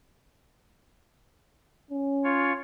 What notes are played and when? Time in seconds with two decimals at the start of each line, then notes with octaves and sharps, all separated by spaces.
1.91 C#4
2.24 F4 C#5